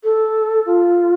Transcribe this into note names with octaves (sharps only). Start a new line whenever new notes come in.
A4
F4